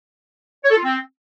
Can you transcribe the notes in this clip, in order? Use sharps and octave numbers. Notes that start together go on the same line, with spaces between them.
C#5
A4
F4
C4